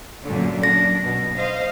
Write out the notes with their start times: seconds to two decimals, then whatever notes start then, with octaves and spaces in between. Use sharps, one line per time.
0.25 F#2 A#2 D3
0.63 D4 A#6
1.02 B2
1.37 C5 D#5 F5